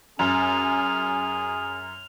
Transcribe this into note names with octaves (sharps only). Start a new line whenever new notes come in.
F#2 C#4 G#4 F6 F7